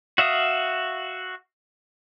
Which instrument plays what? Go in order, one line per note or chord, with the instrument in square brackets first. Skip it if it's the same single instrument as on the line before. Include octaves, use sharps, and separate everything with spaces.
[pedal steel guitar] F#4 E5 F5 D#6